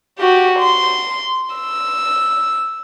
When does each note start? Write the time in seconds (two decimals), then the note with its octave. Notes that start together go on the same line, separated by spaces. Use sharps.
0.19 F#4 G4
0.59 C6
1.56 E6